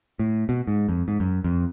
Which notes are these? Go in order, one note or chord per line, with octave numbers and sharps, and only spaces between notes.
A2
B2
G#2
F2
G#2
F#2
F2